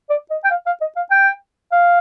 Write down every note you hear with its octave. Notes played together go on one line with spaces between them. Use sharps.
D5
D#5
G5
F5
F5
D#5
F5
G5
F5